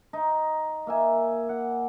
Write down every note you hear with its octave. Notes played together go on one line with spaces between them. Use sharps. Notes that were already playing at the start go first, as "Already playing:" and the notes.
D#4
A#3 E5 G#5
F#5